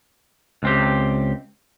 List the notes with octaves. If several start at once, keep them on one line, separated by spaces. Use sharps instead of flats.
C#2 C4 G4